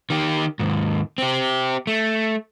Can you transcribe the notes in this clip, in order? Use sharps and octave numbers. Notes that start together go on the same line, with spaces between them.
D#3 G4
D#2 G#2
C4 G4
A3